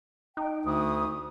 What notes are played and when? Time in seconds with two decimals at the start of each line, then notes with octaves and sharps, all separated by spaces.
0.37 D#4 G5
0.65 D2 D#6